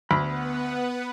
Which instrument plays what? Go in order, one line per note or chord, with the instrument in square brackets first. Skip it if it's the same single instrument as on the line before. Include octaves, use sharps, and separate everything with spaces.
[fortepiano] D2 [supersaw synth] B3 B4 F#5 [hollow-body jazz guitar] B5